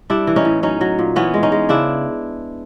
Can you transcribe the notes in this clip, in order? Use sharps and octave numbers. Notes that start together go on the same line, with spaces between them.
G3 D4 E4
E3
C#4 D#4
A2
F#3 C#4 D#4
F#3
A#2
E3 B3 C#4
G#3
C#4 D#4
G#3
C#3 D4 E4